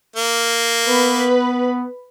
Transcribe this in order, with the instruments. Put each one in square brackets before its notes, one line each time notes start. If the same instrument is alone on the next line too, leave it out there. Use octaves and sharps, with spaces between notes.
[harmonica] A#3
[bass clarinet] B3 [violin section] B4